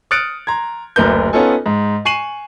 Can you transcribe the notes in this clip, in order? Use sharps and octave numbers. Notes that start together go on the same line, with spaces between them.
D#6 F6 F#6 A6 C#7 D7
A#5 C6 G#6
F#1 D2 A#4 B4 G6
B3 C#4 D#4 F4 A4 G#5
G#2
G#5 C#6 C7 D#7 E7 F#7